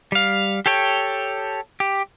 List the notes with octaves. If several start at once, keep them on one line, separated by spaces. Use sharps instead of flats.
G3 F5
G4 A4 C#5 G5
G4